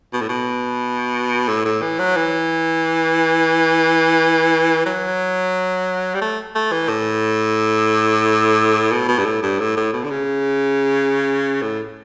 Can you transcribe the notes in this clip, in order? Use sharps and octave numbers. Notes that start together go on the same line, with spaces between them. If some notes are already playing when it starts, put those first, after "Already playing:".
B2
A2
B2
A2
A2
E3
F#3
E3
F#3
G3
A3
A3
E3
A2
B2
B2
G2
A2
G2
A2
A2
B2
D3
C#3
A2